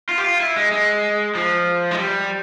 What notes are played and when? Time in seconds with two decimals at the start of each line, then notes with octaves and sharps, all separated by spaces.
0.09 F4
0.18 G4
0.24 F4
0.40 E4
0.56 G#3
0.72 G#3
1.35 F3
1.91 G#3
1.98 G3